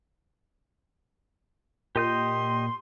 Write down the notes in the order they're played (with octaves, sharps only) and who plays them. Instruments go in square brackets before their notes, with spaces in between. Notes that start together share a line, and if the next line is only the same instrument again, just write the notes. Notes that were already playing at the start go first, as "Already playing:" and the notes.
[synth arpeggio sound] A#2 [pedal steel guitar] G4 D#5 G6 [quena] C6